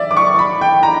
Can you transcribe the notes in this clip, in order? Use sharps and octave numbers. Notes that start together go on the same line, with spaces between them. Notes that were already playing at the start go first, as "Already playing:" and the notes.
Already playing: D5 E5
D6
C#6
B5
G5
A#5